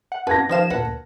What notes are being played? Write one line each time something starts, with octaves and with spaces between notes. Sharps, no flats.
F#5
B4 A5 G#6 A#6
D#3 F3 B3 G4 F5 E7
D2 A#2 B4 F#5